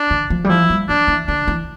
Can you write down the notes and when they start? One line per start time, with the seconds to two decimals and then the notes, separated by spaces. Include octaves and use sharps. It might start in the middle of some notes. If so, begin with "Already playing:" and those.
Already playing: D4
0.10 D3
0.30 F3
0.44 G3
0.49 F3 E4
0.70 G3
0.88 F3 D4
1.08 E3
1.27 D3 D4
1.48 E3